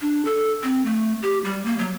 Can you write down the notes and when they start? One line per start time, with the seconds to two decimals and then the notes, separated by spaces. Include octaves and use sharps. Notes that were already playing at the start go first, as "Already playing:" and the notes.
0.01 D4
0.25 A4
0.63 C4
0.85 A3
1.22 G4
1.44 G3
1.65 A#3
1.79 F#3